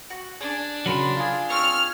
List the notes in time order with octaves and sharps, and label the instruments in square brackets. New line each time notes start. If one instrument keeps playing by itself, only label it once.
[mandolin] F#4
[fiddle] D4 [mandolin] G#4
[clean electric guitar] C#3 F#3 [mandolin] A#4 B5 C6
[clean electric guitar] F4 G#4
[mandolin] C4 C#6 D#6 [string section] F6